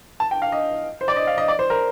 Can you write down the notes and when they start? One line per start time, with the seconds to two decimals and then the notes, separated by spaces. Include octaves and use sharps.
0.20 A5
0.31 G5
0.42 F5
0.52 D#5
1.01 C5
1.08 D5
1.16 D#5
1.27 F5
1.38 D#5
1.48 D5
1.59 C5
1.70 A#4